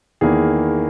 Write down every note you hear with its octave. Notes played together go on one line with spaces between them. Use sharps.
E2 D#3 A#3 E4 G#4